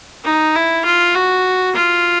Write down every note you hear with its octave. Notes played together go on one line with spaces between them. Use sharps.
D#4
E4
F4
F#4
F4